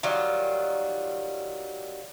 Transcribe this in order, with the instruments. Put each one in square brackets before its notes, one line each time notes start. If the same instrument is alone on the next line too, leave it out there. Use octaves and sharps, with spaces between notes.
[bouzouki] D#3 F#3 G3 F4